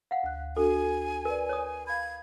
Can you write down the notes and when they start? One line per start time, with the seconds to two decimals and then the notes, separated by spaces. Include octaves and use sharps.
0.11 F5 F#5
0.23 D2 F#6
0.57 D4 F#4 A4 G#5
1.25 A#4 B4 D5
1.49 C#5 D#6
1.87 F5 B5 G#6